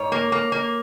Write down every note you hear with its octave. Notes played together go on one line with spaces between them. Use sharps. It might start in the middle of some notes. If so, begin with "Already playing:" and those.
Already playing: G#2 C#5
A#3
A#3
A#3